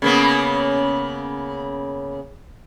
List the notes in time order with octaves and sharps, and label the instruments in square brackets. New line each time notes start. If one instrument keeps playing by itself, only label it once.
[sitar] C#3 A#3 B3